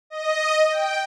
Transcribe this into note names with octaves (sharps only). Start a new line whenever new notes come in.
D#5
G5